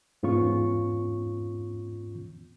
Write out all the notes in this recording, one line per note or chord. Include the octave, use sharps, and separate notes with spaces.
E2 G#2 B3 C#4 F4 C#6